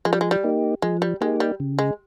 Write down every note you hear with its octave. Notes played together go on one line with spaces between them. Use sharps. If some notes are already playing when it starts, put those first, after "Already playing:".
F3 G#3
G3
G#3
G3
A#3 D#4 G4
F3 G#3
G3
G#3 A#3 D#4 G4
G3
C#3
G#3